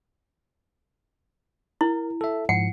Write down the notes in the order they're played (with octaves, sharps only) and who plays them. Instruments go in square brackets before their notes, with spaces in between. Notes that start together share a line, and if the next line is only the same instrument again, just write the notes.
[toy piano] E4 [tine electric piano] A#4
[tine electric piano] A4 E5
[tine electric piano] G#2 F3 C#7 [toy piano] F#5